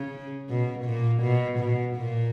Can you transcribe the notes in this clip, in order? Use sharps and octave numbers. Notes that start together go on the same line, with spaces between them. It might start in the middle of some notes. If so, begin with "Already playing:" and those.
Already playing: C#3
B2
A#2
B2
B2
A#2